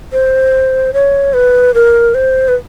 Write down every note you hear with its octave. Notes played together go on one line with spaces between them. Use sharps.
C5
C#5
B4
A#4
C5
B4